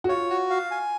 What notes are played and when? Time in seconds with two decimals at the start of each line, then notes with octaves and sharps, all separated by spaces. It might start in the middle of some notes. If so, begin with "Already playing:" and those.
0.04 F#4
0.09 F4 C#5
0.30 F#4
0.50 F5
0.71 G#5